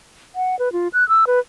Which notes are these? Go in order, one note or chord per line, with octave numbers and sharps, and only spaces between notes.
F#5
B4
F4
F#6
E6
B4